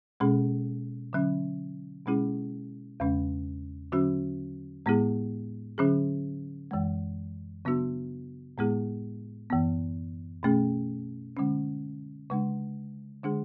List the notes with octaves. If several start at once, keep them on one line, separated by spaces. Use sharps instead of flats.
B2 G#3 C#4 G#4
D3 F#3 C#4
B2 G#3 C#4 E4 G#4
E2 C#3 G#3 C#4
D3 F#3 C#4 F#4
A2 G#3 B3 E4 G#4
D3 F#3 C#4 G#4
F#2 E3 G#3
C#3 F#3 B3 D4 F#4
A2 G#3 B3 E4 G#4
F#2 E3 B3
B2 A3 C#4 G#4
D3 G#3 C#4
C#3 G#3 D4
D3 G#3 D4 G#4